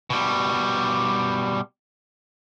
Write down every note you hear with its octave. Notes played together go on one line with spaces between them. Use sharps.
B2 G3